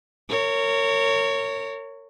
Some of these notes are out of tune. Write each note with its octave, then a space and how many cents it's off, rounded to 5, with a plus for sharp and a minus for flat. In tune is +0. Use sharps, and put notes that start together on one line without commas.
A#4 -30 C#5 +0